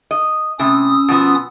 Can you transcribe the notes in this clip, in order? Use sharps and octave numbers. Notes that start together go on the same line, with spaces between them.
D#5
A2 C3 C#4 D#6 E6
B2 F3 B3